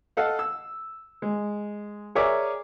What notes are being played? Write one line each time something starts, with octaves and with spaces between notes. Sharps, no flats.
A4 D#5 F5 F#5
E6
G#3
G#4 A#4 C#5 D5 E5 D6